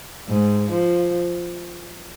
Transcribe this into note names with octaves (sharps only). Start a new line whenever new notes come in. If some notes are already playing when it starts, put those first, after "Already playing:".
G#2
F3